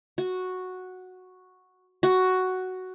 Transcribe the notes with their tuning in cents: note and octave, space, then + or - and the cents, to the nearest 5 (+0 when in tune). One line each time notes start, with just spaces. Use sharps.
F#4 -5
F#4 +5